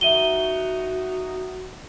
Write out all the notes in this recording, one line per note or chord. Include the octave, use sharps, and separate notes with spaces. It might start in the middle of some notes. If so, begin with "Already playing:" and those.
D#4 F#4 E5 D#7 G7